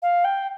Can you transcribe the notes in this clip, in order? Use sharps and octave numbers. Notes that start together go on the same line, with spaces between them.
F5
G5